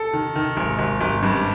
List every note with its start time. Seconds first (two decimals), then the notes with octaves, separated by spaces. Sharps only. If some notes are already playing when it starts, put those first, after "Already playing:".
Already playing: A4
0.13 D#3
0.36 D#3
0.57 G#1
0.79 G#1
1.01 G#1
1.22 G2